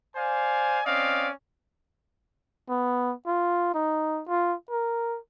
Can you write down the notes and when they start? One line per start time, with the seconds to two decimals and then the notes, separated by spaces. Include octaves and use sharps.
0.16 C5 D5 F5 G#5
0.85 C4 C#4 D5 D#5 F5
2.69 B3
3.27 F4
3.74 D#4
4.28 F4
4.70 A#4